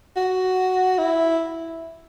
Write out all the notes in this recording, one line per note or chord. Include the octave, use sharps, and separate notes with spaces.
F#4
E4